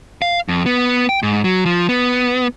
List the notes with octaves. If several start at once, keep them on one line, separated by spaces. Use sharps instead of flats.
F5
F2
B3
G5
G#2
F#3
F3
B3